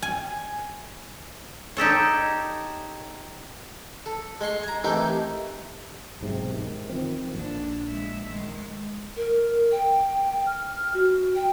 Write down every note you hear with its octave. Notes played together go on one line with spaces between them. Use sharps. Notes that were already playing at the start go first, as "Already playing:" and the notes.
G#5
D#4 G4 A4 C#5
A4
G#3 D#5 C6 C#6
G#5 A#5
D#3 E3 A3 C4 D#4 G4
B1 G#2 C3
D#3
D#3 F3 C4
A#1 D4
G#3 E5
D#3 G#3
A#4
G5
F6
F#4
G5